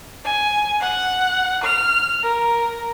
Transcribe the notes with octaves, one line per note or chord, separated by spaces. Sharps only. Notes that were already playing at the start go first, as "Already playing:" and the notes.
G#5
F#5
F6
A#4